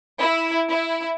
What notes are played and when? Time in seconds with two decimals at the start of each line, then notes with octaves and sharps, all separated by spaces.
0.20 E4
0.70 E4